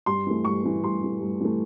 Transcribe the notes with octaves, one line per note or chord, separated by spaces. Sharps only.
G2 C6
E3 A3
G2 C#6
E3 A3
G2 C6
E3 A3
G2
E3 A3